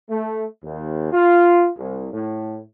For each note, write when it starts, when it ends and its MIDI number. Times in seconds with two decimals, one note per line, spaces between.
0.10 0.44 57
0.64 1.09 39
1.12 1.69 65
1.78 2.12 36
2.13 2.59 45